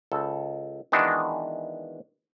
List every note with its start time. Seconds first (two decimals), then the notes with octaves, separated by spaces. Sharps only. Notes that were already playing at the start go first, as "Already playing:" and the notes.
0.12 C#2 A4
0.92 D#3 E3 G#3 B3 D4 F#4